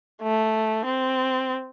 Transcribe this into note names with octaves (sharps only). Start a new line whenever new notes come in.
A3
C4